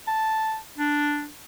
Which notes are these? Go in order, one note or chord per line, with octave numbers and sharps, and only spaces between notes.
A5
D4